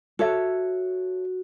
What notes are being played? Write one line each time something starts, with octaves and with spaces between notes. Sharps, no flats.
F#4 A4 C#5 E5